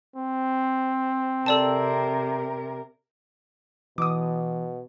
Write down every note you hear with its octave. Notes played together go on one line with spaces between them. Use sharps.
C4
C3 A4 A#4 D5 A5
B2 E3 D6 D#6